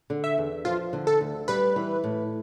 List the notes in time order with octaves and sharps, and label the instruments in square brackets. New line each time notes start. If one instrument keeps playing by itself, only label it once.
[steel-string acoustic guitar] D3
[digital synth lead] E5
[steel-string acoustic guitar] E2
[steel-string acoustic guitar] F3 [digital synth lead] F4
[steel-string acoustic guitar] D3
[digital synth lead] A4
[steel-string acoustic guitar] D2
[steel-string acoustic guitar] G3 [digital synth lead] B4
[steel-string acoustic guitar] E3
A2